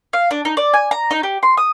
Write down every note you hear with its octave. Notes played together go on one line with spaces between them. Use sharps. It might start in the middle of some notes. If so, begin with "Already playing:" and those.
F5
D4
D#4
D5
G#5
A#5
D#4
G4
C6
D#6